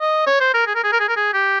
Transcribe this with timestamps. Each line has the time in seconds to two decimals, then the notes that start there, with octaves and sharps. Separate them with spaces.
0.01 D#5
0.27 C#5
0.41 C5
0.54 A#4
0.67 G#4
0.75 A#4
0.83 G#4
0.92 A#4
1.00 G#4
1.08 A#4
1.17 G#4
1.33 G4